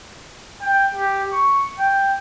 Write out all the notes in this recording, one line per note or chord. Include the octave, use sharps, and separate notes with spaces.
G5
G4
C#6
G5